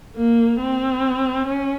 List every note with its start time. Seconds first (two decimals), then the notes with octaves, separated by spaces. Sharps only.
0.16 A#3
0.60 C4
1.47 C#4